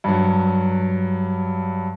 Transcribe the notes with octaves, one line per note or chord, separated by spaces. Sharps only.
G2 F#3